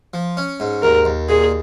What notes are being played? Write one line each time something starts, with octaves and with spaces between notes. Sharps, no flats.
F3
C#4
G#2
D#2 A#4
D#2
A#2 G#4